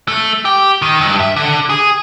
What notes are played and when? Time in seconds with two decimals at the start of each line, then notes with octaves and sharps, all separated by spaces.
0.08 A3
0.45 G4
0.82 D#3
1.01 G2
1.19 E5
1.36 D3
1.69 G#4